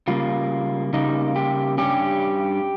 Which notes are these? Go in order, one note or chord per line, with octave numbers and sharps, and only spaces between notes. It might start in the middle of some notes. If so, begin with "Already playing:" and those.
C#3 G3 A#3 F4
C#3 G3 A#3 D#4
G4
G2 G3 C#4 G4